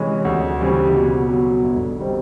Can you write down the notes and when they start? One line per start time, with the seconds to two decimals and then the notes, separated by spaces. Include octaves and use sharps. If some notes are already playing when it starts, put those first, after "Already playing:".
Already playing: C3 E3 G#3 C#4
0.25 D2
0.60 C#3 E3 G3 C4
0.94 B2
1.29 F#3 B3
1.64 G1
1.99 D#3 G3 C4